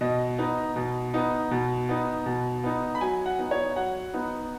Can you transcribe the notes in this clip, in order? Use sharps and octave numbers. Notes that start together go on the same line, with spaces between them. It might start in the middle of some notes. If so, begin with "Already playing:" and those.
B2 D#5
B3 D#4
B2
B3 D#4
B2
B3 D#4
B2
B3 D#4
B5
F#3 G#5
F#5
B3 D#4
C#5
F#3 F#5
B3 D#4